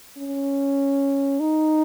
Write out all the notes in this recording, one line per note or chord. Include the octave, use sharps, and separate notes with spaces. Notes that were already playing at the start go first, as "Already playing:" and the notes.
C#4
D#4